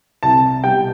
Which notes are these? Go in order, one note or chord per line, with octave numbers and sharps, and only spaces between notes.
C2 A5
B2 G3 G5